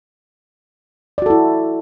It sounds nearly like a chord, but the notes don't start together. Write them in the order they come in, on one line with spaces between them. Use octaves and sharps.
D5 F#4 A4 E4